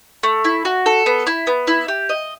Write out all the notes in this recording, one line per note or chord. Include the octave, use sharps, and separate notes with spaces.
A3
E4
F#4
A4
B3
E4
B3
E4
G4
D#5